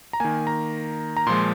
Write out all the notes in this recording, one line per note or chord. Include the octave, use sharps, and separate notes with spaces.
A#5
D#3 A#3 G#5
A#5
A#5
A#2 F3 G#3 C6